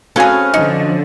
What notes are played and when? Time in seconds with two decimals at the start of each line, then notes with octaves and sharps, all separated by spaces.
0.16 C4 C#4 F#4 G#4 A4 B4 F5 G#5
0.54 D3 F3 D#4